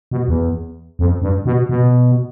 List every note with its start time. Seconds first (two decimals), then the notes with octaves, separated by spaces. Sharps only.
0.11 B2
0.28 E2
0.99 F2
1.22 G2
1.45 B2
1.69 B2